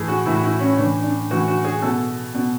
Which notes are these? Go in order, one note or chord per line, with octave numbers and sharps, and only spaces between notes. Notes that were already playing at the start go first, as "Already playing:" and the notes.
Already playing: A2 E3 G#4 A4
F#4
A2 E3 E4
F#4
E4
C#4
A2 E3 D4
D4
A2 E3 F#4
F#4
G#4
B2 A4
B2